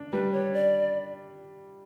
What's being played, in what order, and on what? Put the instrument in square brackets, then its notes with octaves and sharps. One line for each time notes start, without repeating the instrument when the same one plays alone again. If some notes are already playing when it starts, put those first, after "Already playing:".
Already playing: [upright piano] D4
[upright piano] G3 [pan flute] B4
[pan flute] C#5
D5